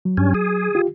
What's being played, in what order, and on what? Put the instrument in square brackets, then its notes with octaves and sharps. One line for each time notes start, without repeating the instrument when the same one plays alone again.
[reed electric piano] F#3
[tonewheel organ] G2 C#4
G#4
[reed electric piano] F4 G4